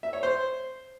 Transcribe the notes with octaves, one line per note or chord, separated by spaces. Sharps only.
E5
C#5
C5